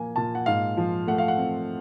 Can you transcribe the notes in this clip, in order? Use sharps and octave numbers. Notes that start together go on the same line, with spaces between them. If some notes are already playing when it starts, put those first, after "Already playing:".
Already playing: A#2 F3 A#3 G#5
A#2 A5
F#5
G#2 F5
F3
A3 F#5
F5
F#5
C4